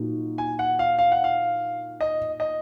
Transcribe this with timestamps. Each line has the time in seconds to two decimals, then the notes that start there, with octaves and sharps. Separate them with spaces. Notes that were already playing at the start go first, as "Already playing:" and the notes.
Already playing: A#2 D#4 F#4
0.38 G#5
0.59 F#5
0.79 F5
0.99 F5
1.12 F#5
1.24 F5
2.01 D#5
2.40 D#5